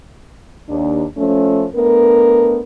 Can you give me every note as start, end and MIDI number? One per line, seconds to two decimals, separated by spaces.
0.68 1.04 39
0.68 1.04 62
1.16 1.66 53
1.16 1.66 57
1.16 1.66 61
1.74 2.60 57
1.74 2.60 59
1.74 2.60 62
1.74 2.60 70